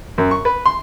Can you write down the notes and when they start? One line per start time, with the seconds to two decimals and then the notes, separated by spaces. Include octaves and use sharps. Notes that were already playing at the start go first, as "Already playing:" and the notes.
0.18 F#2
0.31 C#6
0.45 B4
0.66 C6